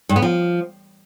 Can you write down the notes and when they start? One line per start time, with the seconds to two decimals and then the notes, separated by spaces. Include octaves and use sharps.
0.09 G2
0.16 B3
0.22 F3